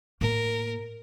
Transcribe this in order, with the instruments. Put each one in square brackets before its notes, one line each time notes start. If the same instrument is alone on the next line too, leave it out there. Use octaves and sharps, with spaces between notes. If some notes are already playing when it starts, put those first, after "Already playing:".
[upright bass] A2 A#3 [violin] A#4